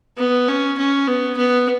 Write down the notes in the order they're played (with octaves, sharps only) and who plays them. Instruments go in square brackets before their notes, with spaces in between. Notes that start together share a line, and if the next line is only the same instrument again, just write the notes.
[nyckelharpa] B3
C#4
C#4
B3
B3